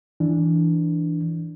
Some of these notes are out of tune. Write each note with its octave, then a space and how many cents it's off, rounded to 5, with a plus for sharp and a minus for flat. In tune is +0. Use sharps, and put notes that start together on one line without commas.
E3 +0 D4 +0